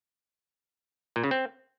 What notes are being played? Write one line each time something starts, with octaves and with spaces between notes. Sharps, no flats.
A#2
C#3
C4